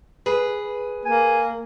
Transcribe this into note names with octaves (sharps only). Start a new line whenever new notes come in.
G#4 B4
A#3 G#5